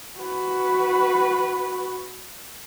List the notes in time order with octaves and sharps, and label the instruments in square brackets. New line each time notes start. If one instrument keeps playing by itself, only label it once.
[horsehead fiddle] F#4 B4